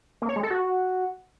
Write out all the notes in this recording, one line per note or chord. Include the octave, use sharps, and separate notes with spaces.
A#3
C#5
G#3
A4
F#4